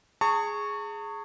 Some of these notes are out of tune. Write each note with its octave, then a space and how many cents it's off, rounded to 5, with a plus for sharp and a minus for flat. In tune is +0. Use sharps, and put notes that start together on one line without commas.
G#4 +0 A5 +45 C#6 +0